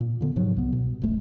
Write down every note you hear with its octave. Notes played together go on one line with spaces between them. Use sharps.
A#2
A#2 D3 B3
G#2 C3 F3 F#3
C2 B3
B2
D1 A1 G#3 A3